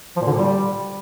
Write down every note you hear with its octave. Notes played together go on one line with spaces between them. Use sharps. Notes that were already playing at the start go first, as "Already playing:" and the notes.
F3
A#2
D3
A#2
G3